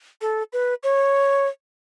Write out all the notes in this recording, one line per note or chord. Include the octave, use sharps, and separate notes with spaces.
A4
B4
C#5